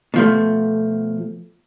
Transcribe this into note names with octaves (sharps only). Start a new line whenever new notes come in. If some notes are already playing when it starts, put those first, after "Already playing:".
B2 F3 A3